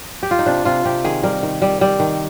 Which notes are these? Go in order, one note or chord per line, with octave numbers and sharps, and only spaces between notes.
G4
F4
D#4
C3 D4
C3 F4
C3 G4
D#3 G#4
G3 A#4
D#3
G3
G3
D#3